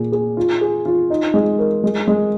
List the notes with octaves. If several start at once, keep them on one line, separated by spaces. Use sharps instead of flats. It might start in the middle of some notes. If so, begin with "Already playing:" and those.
Already playing: A#2 G#4
G#4
F4
G#4
F4
D#4
G#3
A#4
G#3
G#3